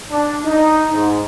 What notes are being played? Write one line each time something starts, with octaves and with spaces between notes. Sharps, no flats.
D4
D#4
G#2